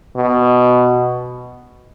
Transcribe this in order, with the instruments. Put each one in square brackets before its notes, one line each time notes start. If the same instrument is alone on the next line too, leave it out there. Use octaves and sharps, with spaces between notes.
[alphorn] B2